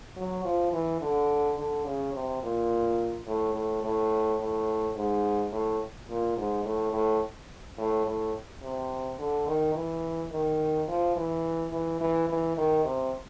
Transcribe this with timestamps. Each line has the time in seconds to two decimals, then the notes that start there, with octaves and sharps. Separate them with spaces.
0.17 F#3
0.45 F3
0.73 E3
1.01 D3
1.58 D3
1.85 C#3
2.14 C3
2.43 A#2
3.27 A2
3.55 A2
3.83 A2
4.40 A2
4.96 G#2
5.52 A2
6.09 A#2
6.37 G#2
6.65 A2
6.93 A2
7.77 A2
8.06 A2
8.62 C3
9.19 D3
9.47 D#3
9.75 E3
10.32 D#3
10.88 F3
11.16 E3
11.72 E3
12.01 E3
12.29 E3
12.57 D#3
12.85 C3